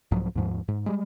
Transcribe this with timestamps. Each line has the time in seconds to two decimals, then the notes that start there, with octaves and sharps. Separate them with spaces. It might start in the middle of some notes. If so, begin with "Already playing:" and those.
0.11 C2 G#2 F3 F#3
0.35 D#2 G#2 F3
0.68 G#2
0.86 G3 G#3